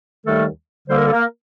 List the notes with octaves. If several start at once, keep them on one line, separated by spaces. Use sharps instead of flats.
D#2 D#3 G3 A3 A4
D2 D3 G3 A#3 C5
A#4
A4
A#3 A#4